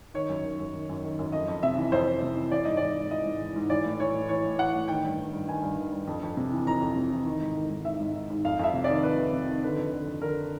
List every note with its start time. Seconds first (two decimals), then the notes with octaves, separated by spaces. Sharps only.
0.14 D#3 C#5
0.29 F#2
0.45 D#3
0.60 F#2
0.74 D#3
0.89 F#2
1.04 D#3
1.19 F#2
1.32 F2 D#5
1.48 F2
1.63 C3 E5
1.77 E3
1.92 F2 C5
2.07 F2
2.22 C3
2.36 E3
2.51 E3 D5
2.65 G#2 D#5
2.77 E3 D5
2.96 G#2
3.11 E3 D#5
3.25 G#2
3.40 E3
3.56 G#2
3.70 E3 D5
3.85 A2
4.00 E3 C#5
4.14 A2
4.29 E3 C#5
4.45 A2
4.59 E3 F#5
4.74 A2
4.88 D#3 G5
5.04 G2
5.19 D#3
5.33 G2
5.48 D#3 G#5
5.62 G2
5.77 D#3
5.92 G2
6.07 F2
6.23 F2
6.37 C3
6.52 E3
6.67 F2 A#5
6.81 F2
6.96 C3
7.11 E3
7.26 D#3
7.41 G#2
7.55 D#3
7.70 G#2
7.85 D#3 E5
8.00 G#2
8.14 D#3
8.30 G#2
8.44 F2 F5
8.59 F2 E5
8.73 C3
8.84 D#3 D5
9.03 F2 B4
9.18 F2
9.33 C3
9.49 D#3
9.63 D3 B4
9.77 F2
9.92 D3
10.07 F2
10.22 D3 A#4